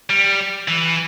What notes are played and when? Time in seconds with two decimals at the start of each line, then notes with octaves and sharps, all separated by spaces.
0.10 G3
0.68 E3